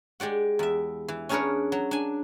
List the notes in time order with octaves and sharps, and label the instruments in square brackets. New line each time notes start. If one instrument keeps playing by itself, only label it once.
[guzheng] G#3 G4 D5 F#5
E2 E5
E3
C#4 D4 G#4 A#4 B4 C#5
F#3
D4 G#5